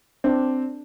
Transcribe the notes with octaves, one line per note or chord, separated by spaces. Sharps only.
C4 D4